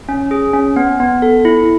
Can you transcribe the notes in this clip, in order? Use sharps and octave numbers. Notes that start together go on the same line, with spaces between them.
C#4
G#4
C#4
B3
B3
A4
E4